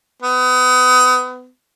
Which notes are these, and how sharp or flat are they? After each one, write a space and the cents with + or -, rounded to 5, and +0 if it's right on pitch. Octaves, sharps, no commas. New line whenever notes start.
B3 +30